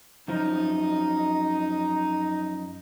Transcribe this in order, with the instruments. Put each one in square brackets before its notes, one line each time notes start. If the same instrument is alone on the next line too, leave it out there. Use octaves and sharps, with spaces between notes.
[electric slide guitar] F#2 F3 [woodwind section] D#4